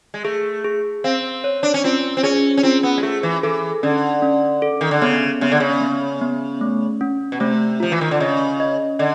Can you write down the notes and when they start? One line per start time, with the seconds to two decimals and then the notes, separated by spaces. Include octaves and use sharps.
0.14 G#3
0.24 A3 G#4
0.64 G#4
1.04 C4 F5
1.44 C#5
1.63 D4
1.74 C#4
1.84 C4 F4
2.17 C4
2.23 C#4 G#4
2.57 C#4
2.63 C4 F4
2.83 B3
2.97 G#3
3.03 A3 G#4
3.23 E3
3.43 E3 A4
3.83 D3 C#4
4.22 C#4
4.62 A4
4.81 D#3
4.91 D3
5.02 C#3 B3
5.41 C#3 B3
5.52 D3
5.60 C#3
5.81 B3
6.22 B3
6.61 A3
7.01 C#4
7.32 B2
7.40 C3 A3
7.80 F3 F4
7.92 E3
8.01 D#3
8.11 D3
8.20 C#3 D#5
8.60 D#5
8.99 D3 D#5